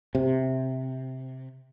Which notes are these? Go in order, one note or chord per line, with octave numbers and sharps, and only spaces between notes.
C3